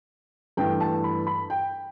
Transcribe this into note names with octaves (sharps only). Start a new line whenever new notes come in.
G2 E3 A3 G5
A5
B5
B5
G5